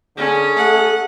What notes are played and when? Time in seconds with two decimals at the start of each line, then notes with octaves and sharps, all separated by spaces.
0.17 D3 C#4 G#4
0.56 A3 F#5